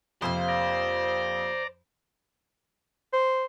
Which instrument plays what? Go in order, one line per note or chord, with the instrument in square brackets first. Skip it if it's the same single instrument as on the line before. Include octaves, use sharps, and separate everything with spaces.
[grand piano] F2 [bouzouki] C3 A#3 F4 [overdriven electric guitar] C5
[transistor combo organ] D5 A#5
[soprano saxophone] C5